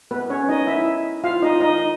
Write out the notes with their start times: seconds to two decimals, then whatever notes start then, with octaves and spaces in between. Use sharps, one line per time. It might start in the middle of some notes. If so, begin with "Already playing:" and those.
0.11 B3 B4
0.30 C#4 C#5
0.49 D#4 D#5
0.67 E4 E5
1.24 F4 F5
1.42 D#4 D#5
1.60 D#4 D#5